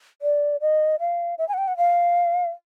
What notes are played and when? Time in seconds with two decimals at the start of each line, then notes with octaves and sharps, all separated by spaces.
0.22 D5
0.61 D#5
1.00 F5
1.38 E5
1.49 G#5
1.54 F#5
1.58 G5
1.68 F#5
1.77 F5